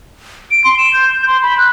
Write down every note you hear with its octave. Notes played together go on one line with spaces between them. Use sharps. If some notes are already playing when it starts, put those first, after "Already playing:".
D7
C6
E7
G6
G6
C6
B5
F#6